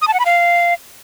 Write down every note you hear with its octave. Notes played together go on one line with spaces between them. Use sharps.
D#6
A5
F#5
B5
F5